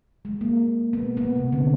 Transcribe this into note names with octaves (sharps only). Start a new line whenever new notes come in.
G#3
A#3
B3
B3
C3
D3